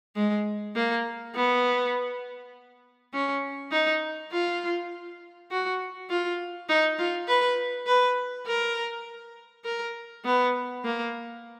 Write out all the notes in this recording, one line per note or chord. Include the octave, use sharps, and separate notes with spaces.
G#3
A#3
B3
C#4
D#4
F4
F#4
F4
D#4
F4
B4
B4
A#4
A#4
B3
A#3